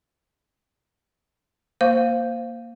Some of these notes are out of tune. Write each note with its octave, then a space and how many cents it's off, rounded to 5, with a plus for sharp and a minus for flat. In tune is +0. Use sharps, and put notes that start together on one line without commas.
A#3 +0 C5 +0 F5 +0